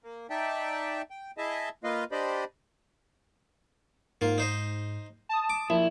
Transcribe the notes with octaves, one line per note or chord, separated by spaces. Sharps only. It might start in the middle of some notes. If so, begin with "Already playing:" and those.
A#3
D#4 D5 E5 G5 A5
G5
E4 G#4 D#5 E5 A5
A#3 F4 B4 D#5 F5
D4 G4 C5 D5 D#5 B5
G#2 A#3 F4
D#4 C5 D#5
A5 D#6
D6
A#1 E4